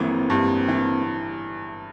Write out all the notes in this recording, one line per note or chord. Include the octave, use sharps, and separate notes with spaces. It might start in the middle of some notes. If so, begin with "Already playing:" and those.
Already playing: G1 E3 A#3 C4
G2
E3